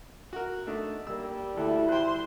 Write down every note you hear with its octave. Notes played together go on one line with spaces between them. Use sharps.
F#4 A#4
A3 D4 D#4
G3 A#3 E6
D2 E4 A4
C5 G5 C6 F#6